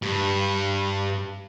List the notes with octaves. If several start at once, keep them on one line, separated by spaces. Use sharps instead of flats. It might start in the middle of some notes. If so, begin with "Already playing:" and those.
G2